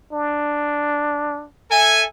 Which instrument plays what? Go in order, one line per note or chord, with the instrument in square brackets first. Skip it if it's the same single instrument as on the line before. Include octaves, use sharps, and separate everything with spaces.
[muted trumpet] D4
[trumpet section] A4 E5 G#5